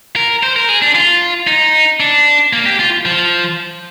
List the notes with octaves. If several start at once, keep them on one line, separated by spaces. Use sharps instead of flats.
A#4
C5
A#4
G#4
D4
F4
D#4
D4
A#3
G4
F4
F3